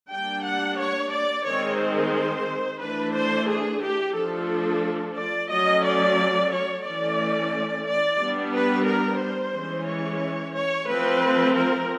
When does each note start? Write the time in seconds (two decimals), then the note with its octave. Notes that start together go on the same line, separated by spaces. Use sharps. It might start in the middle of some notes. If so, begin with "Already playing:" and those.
0.11 G3 A#3 D4 G5
0.45 F#5
0.79 C#5
1.12 D5
1.46 D#3 G#3 C4 C#5
1.79 C5
2.81 E3 A3 D4 B4
3.14 C5
3.48 G#4
3.82 G4
4.16 F3 A3 D4 A4
5.16 D5
5.50 F#3 A3 C#4 D#5
5.84 D5
6.52 C#5
6.85 E3 A3 C#4 D5
7.86 D5
8.20 G3 B3 D4
8.53 B4
8.87 A#4
9.20 C5
9.55 E3 G#3 C#4
9.88 C#5
10.55 C#5
10.89 F3 A3 C4 B4
11.57 A#4